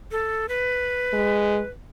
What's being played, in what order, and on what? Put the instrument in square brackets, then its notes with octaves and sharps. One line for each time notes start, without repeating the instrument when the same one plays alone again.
[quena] A4
B4
[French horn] G#3